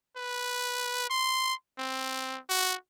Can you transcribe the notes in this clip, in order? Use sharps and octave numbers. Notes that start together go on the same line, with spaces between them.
B4
C6
C4
F#4